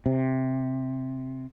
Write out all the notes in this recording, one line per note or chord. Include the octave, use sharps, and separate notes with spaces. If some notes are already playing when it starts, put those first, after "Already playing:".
C3